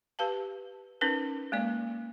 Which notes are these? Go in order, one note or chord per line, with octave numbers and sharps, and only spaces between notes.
G4 B4 F5 A5
C#4 D#4 A#4 B4
G#3 A#3 D5